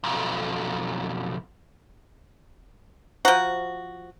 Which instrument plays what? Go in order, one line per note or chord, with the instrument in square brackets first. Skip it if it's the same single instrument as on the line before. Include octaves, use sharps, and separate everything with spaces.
[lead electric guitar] B1 F2
[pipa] F3 F#4 [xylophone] C5 F#5 A#5